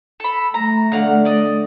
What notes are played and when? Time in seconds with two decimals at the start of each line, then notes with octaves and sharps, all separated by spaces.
0.20 A4 B5
0.54 A3 A#5
0.92 D3 F#3 F5 F#5
1.25 D5 D#5